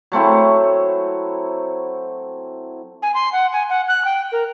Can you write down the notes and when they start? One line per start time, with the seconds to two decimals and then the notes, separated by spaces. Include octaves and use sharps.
0.12 F#3 A3 C4 E4
3.02 G#5
3.14 C6
3.32 F#5
3.53 G#5
3.69 F#5
3.88 F#6
4.05 G5
4.32 A#4